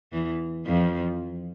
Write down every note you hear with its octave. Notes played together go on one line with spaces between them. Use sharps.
E2 E3
F2 F3